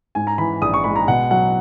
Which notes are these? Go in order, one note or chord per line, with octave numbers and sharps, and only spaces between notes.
G#2 G#5
A#5
E3 B5
A#1 D#6
C#6
G#3 B5
A#5
B2 F#5
F#3 F#5